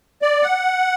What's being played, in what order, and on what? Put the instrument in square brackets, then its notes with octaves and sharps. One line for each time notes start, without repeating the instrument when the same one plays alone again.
[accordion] D5
F#5